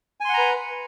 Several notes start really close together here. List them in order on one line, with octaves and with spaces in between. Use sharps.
G#5 C6 F#5 A#5 B4